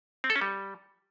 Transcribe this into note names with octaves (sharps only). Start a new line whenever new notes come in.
C4
A4
C#4
G3